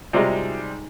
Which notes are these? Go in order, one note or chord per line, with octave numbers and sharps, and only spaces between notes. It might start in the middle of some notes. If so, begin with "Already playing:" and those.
C3 G3 G#3 C4 D#4 F4 F#4 E5